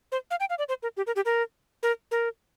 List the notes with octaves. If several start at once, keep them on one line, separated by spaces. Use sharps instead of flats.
C5
F5
G5
F5
D5
C5
A#4
G4
A#4
G4
A#4
A#4
A#4